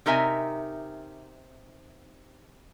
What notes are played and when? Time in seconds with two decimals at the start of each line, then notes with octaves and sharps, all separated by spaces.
0.06 C3 D#4 A#4 E5 G#5